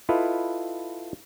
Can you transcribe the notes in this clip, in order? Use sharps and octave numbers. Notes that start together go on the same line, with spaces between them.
E4 F4 A4 B4 D#5 F5